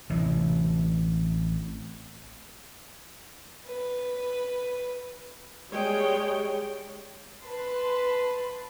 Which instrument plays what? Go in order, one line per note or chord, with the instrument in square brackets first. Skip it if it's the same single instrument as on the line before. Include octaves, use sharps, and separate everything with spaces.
[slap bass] A1 C3 E3
[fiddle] B4
[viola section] G3 G#3 C#5 G5
[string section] B4 A5 C6